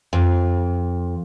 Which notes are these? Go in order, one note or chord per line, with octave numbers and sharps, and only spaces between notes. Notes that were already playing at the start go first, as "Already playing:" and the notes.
F2